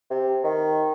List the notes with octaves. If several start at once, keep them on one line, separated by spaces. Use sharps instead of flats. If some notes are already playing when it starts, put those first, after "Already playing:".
C3
D#3